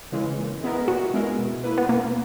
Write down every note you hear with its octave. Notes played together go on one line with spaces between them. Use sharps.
C#3 E3 G#3
A#2
G#3 B3 E4 A#4
A#2 F#4
G#3 B3 E4 A#4
B2
A#3 E4 B4
B3
B2 A#3